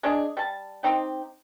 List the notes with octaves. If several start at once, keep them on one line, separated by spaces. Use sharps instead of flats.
G#3 D4 G#4
G3 A5
C4 D#4 G4